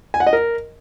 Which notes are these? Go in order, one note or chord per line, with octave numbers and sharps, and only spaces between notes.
G#5
F#5
D#5
A#4